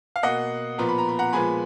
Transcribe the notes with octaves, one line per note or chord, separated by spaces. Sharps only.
F5
B2 A#3 D#5 F#5
A#2 F3 B3 A#5
B5
A#5
B5
F#5 A#5
A#2 F3 G#3 B3 G#5 B5